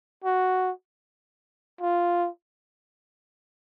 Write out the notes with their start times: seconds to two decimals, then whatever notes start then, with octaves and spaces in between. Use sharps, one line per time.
0.24 F#4
1.81 F4